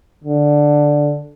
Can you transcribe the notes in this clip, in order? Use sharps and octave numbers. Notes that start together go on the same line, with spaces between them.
D3